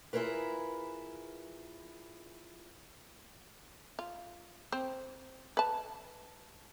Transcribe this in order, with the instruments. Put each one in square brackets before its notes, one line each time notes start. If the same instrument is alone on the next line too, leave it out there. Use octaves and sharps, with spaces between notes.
[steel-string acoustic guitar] E4 F4 G#4 A#4 B4
[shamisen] F4
C4 C5
B4 A5